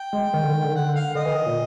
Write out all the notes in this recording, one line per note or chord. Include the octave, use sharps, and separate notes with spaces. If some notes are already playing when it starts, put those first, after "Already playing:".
Already playing: G5
G#3
D#3
D3
D#3
D3
D#3
D3 F#5
F5
D3 D#5
E3
D#3
A#2